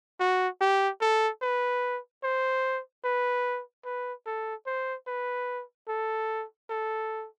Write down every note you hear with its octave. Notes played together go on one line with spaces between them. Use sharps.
F#4
G4
A4
B4
C5
B4
B4
A4
C5
B4
A4
A4